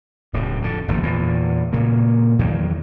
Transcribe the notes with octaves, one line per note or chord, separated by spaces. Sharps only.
D1 A2 C#3
F2 D3
F#1 D#2 A2 F3
E2 A#2
A#2 C#3 A#3
E2 D#3 F#3